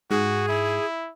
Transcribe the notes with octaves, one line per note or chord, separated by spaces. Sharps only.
G#2 F#4 G#4
E4